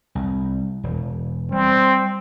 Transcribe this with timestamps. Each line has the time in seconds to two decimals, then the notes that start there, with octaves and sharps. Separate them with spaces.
0.15 C2
0.84 E1
1.52 G3 C4